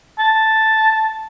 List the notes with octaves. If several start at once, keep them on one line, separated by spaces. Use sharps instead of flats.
A5